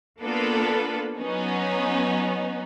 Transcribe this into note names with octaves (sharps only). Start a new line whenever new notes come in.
A#3 B3 D4 F4 A4 B4
F#3 B3 C#4 D#4